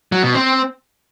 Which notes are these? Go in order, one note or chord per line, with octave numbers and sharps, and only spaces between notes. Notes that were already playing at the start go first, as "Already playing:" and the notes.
F#3
B2
C4